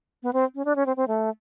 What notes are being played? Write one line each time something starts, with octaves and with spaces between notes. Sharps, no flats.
B3
C4
C#4
D4
C#4
C4
C4
A3